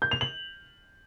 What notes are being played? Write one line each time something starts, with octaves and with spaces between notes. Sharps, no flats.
G6
F7
F#7